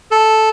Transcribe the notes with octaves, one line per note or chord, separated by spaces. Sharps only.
A4